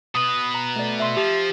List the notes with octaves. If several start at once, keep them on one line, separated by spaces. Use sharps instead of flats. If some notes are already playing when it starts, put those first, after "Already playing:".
B2 B4 D#6
A#5
A3 D5
E5 C6 B6
F3 G4